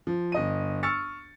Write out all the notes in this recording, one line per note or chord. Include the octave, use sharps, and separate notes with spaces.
F3
G1 D#5 D#7
C#6 E6 F6 A6 C#7